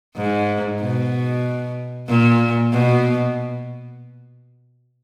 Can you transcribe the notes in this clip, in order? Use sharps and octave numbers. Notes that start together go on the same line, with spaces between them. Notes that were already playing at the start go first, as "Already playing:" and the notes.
G#2
B2
A#2
B2